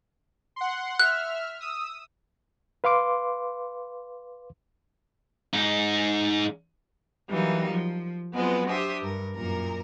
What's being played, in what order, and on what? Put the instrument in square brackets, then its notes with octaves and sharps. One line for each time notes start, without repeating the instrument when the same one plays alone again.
[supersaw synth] F#5 C6
[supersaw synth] E5 F6 [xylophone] F#6
[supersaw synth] D#6 E6
[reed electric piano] B4 F5 C6 D6
[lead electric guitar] G#2 D#4
[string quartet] E3 F#3 G3 A#3 D#4
F3
F#3 G#3 B3 C4 F4 B4
D4 G4 C5 E5 D#6
G2 A#4
F#2 A#2 A#4 A#5